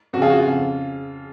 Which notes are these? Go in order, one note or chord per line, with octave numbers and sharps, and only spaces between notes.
F2 C#3 F4 F#4 G#4
F#4
F4
F2 C#3